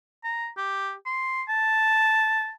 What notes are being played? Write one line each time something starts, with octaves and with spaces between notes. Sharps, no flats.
A#5
G4
C6
A5